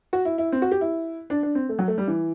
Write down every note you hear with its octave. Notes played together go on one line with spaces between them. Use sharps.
F#4
E4
E4
C4
F#4
G4
E4
D4
D4
C4
A3
F#3
A3
G3
E3